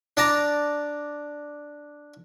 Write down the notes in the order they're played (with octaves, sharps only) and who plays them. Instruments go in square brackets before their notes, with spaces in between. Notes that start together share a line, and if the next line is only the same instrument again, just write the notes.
[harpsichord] D4 D5 A5 A#5